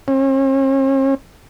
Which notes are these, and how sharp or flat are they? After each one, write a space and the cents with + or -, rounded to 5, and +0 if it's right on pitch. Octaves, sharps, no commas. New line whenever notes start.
C#4 -45